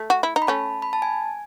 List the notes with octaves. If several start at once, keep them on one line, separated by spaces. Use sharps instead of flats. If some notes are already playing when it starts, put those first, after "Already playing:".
Already playing: A3
F#4
E4
D#4
B5
A3 C#4 A5
B5
A5
G#5